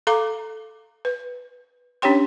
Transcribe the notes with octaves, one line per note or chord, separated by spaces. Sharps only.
A4 F5 A#5 D6
B4
C#4 D4 G4 C#5 G5 C6